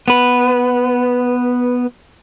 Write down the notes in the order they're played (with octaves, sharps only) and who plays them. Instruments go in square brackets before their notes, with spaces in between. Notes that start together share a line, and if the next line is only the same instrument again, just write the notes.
[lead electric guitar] B3 B4